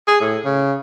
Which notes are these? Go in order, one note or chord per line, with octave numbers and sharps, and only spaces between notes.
G#4
A2
C#3